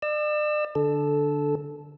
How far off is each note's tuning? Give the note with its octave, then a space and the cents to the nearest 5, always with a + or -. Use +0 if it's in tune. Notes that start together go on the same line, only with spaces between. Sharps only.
D5 +40 E6 +10
D3 +0 A4 -10